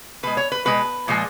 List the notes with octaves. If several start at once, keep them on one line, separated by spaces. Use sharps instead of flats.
B2 G#3 B4
C#5
B4
B2 G#3 B4
A#2 F3 G#3